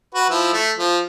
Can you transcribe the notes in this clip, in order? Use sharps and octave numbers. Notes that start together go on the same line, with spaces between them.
F#4 B4
F3 E4
A3
F3